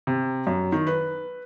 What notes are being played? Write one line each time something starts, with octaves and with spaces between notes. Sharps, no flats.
C3
F#2
D#3
B4